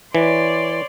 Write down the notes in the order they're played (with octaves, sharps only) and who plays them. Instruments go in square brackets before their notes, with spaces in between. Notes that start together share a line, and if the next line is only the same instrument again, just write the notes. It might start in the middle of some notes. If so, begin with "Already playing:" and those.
[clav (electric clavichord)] E3 [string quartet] C#5 D5 C6